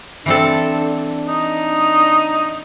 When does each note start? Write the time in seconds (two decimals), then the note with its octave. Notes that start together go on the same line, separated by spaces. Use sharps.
0.26 E3 C4 D4 A4
1.28 D#4